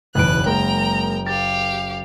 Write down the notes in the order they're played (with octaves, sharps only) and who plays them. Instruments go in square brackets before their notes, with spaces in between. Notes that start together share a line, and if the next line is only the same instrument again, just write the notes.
[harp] F#1 D7 [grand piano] B1 E2 [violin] B4 F#6
[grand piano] G#3 A#3 [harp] A#4 [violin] G5 A#5
[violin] G4 F5 [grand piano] A6